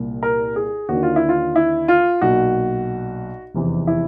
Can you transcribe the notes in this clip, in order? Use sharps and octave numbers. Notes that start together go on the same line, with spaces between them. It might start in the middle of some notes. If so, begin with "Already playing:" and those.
Already playing: C2 A#2
A#4
G#4
D#2 D3 F#4
F4
E4
F4
E4
F4
B1 A#2 F#4
F1 E2 C3 E3
E4